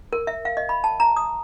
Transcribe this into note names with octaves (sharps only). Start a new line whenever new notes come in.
A#4
E5
F5
D#5
B5
A5
A#5
D#6